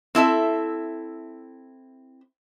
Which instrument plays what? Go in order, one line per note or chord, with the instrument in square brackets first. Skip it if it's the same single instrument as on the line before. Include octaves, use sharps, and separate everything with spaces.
[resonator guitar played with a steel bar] C4 E4 A4 E5